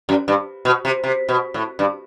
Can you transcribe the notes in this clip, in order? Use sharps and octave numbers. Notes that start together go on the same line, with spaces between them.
F#2
G2
B2
C3
C3
B2
A2
G2